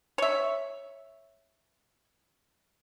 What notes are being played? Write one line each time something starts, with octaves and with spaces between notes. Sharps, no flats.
C#5 E5